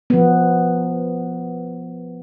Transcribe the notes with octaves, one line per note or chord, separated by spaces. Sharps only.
F3 B3